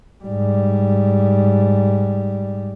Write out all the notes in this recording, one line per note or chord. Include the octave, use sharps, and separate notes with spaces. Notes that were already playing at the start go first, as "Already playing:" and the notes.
G#2 G3